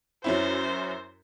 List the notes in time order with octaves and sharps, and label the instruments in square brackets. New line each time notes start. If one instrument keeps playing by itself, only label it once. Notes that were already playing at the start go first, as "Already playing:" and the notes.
[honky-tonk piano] F#2 C#4 E4 [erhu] C5